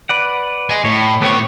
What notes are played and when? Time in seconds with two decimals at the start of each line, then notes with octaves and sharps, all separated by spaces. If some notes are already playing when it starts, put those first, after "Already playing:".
0.09 B4 D5 F#5
0.70 D#5 G#5
0.85 A2 C#5
1.22 A2 B3 C4 G4 C#5